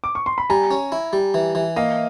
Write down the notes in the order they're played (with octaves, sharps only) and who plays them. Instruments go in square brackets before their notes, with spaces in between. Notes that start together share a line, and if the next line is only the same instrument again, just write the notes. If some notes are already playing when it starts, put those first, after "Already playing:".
[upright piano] D6
C#6
C6
B5
[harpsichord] G3 [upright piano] G#5 A#5
[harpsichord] C#4
E4
G3
E3
E3
[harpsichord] A#3 [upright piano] D#5 F5